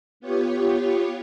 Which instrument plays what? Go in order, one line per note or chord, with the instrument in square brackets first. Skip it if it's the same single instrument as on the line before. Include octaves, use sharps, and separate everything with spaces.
[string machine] B3 F4 G4 C#5